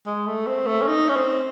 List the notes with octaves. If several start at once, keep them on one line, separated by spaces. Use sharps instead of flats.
G#3
A3
C4
A3
C#4
D#4
C#4
C4